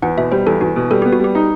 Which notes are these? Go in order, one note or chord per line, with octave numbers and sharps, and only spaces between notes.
E2 F#5
B2 E5
G3 C5
E2 A4
E2 F#4
B2
G3 A4
B3 G4
F#4
G3 G4
D#4